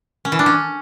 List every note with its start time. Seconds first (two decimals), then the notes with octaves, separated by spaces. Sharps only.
0.25 C#4
0.32 E3
0.39 D4
0.46 C#4